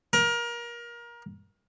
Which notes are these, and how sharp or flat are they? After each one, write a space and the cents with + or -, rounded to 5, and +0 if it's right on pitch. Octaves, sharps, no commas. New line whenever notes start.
A#4 +25